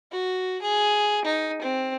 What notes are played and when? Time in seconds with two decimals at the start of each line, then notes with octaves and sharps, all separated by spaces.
0.12 F#4
0.62 G#4
1.25 D#4
1.62 C4